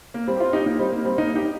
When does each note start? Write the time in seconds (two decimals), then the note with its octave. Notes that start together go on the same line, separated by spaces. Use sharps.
0.14 A#3
0.27 G3 C4
0.36 G4
0.40 C4 F4
0.53 D#4 G4
0.66 A#3 D#4
0.79 G3 C4
0.92 A#3
1.05 G3 C4
1.18 A#3 D#4
1.35 D#4 G4